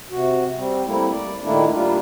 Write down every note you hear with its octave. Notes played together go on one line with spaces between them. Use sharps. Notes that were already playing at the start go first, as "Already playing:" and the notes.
C3 F#4
G3 C4
G3 A3 A#3 C4 E4
D5
A#2 D#3 A3 A#3 D4 E4
G3 A#3 D4 F4